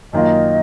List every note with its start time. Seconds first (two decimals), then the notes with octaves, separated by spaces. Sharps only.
0.13 F#2 D#3 A#3 F4 D#5